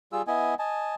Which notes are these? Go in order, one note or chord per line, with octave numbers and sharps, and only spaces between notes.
G3 F4 G#4 E6
B3 E4 D#5 G#5
D#5 G#5 A5